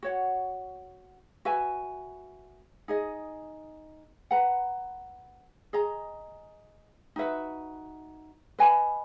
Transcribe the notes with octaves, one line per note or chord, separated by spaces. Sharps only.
F#4 C#5 F#5
F#4 B4 E5 G#5
D#4 G#4 D#5
B4 F#5 A#5
G#4 D#5 A#5
D#4 F#4 B4 E5
B4 D#5 G#5 B5